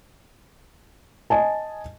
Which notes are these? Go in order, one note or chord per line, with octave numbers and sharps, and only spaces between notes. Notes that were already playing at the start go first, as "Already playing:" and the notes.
D#5 G#5 A5